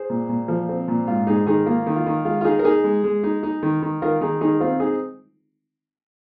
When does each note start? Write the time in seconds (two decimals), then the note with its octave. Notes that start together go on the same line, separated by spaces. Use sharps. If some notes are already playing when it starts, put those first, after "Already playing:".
Already playing: G#4 C5
0.10 A#2
0.29 A#2
0.48 F3
0.69 C4
0.88 A#2
1.08 G#2 F4
1.27 G#2 D#4 G#4
1.47 D#3 D#4 G#4
1.66 A#3 F4
1.86 D#3
1.96 F4
2.06 D#3
2.25 G#3 F4
2.41 F4
2.45 D#4 G#4
2.59 A#4
2.64 D#4 G#4
2.84 G#3
3.04 G#3
3.23 D#4
3.43 D#4
3.63 D#3
3.82 D#3
4.02 D#3 F4 A#4
4.21 D#3 D#4 G#4
4.41 D#3 D#4 G#4
4.60 C4 F4
4.80 D#4 G#4